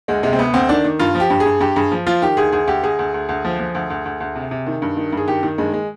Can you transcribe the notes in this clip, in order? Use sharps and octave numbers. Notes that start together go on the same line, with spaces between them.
D2 G#3
C3 G#3
C4
D2 B3
D2 C4
D#3 D4
D#3
G2 F4
F3
G4
G2
G#4
G2
G2 G4
G2 G#4
F3
F3 F4
D#3 G4
D2 G#4
D2 G#4
D2 G4
D2 G#4
D2
D2
D2
F3
F3
D2
D2
D2
D2
C3
C3
D#3
G2
D#3
G2 G#4
D#3 G4
D#3
G2 G#3
G#3